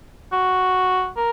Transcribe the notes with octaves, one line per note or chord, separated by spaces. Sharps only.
F#4
A#4